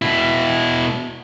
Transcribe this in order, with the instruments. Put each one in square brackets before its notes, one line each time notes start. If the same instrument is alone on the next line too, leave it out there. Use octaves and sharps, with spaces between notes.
[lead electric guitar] B2 E4